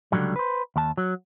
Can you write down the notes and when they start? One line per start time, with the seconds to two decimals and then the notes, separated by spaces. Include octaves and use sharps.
0.12 C#2 D3 D#3 F#3 G3
0.36 B4 C5
0.76 D#2 A5
0.97 F#3